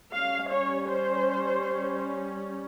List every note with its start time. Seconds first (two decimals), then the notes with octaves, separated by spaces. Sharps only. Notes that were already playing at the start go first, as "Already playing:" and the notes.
0.13 G3 C#4 F5
0.51 C#5
0.88 C5